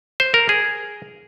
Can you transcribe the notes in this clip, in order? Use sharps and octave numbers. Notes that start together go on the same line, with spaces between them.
C5
A#4
G#4